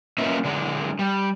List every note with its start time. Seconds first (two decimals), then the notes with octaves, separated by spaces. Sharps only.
0.18 A#3 C#4 F4 B4 D#5 E5
0.45 D3 F#3 G#3 D4
0.99 G3